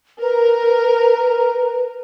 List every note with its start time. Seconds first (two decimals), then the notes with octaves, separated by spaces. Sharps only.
0.22 A#4 B4